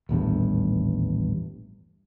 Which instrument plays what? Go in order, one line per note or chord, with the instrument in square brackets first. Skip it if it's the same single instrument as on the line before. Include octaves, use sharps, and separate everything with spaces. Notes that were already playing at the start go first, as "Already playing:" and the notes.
[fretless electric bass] D#1 A1 E2 G2